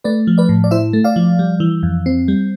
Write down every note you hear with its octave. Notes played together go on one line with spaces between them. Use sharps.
A3 B4 D5
F3
B4 D5
A2
D5
E4 C5 E5
A3
D5 F5
F3
G3
E3
F2
C4
G3